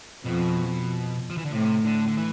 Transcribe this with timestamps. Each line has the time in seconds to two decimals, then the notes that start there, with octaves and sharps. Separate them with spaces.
0.25 F2 B2
1.30 F3
1.38 E3
1.45 D3
1.52 A2 C3
1.85 D3
2.07 D3
2.17 E3